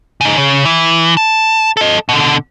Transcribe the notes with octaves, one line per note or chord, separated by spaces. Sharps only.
C#3 D#4
C#3
E3
A5
A4 D#5
B2 D3